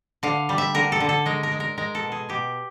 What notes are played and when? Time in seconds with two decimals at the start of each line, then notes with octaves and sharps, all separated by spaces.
0.23 D3 F5
0.49 G3
0.58 E5
0.75 D3 A#4
0.92 A4
1.00 D3
1.09 A4
1.26 G#3 A#4
1.43 A#4
1.51 G#3
1.60 A#4
1.78 G#3 A#4
1.95 A4
2.03 B2
2.12 G#4
2.29 B2 G4